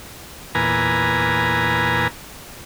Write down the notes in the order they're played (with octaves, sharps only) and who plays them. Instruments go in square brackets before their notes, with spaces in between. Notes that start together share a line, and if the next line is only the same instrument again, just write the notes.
[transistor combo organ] E2 A#2 B4 G#5 A#5